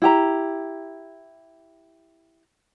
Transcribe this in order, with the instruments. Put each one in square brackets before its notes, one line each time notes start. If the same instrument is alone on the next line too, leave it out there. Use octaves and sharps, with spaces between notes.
[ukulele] E4 G4 A#5